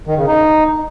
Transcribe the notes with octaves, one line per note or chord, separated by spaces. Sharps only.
D#3
C#3
D#4